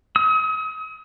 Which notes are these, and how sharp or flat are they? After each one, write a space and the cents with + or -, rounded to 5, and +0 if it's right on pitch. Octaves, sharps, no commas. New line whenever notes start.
D#6 +40